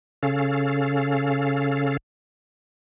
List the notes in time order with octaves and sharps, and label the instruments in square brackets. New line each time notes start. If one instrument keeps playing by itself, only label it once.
[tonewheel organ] C#3 C#4 A4 F5